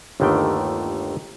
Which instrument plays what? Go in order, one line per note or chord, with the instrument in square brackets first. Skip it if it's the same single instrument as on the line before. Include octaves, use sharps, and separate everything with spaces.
[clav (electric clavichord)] G1 D#2 D3 D#3 A3 G5